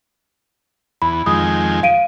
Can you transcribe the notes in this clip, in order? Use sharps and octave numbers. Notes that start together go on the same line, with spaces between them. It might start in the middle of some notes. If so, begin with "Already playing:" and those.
E2 B5
F2 D#3 G#3 D#6
F5 D7 D#7